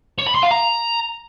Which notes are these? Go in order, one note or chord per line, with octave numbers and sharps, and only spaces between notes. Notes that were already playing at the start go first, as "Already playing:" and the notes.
C#5
B5
C6
F5
A#5